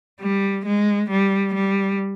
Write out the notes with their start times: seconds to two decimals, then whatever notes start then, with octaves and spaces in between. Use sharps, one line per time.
0.21 G3
0.66 G#3
1.10 G3
1.55 G3